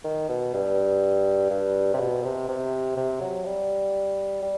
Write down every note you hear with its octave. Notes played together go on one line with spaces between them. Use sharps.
D#3
B2
G2
G2
C3
B2
C3
C3
C3
F#3
G3
G3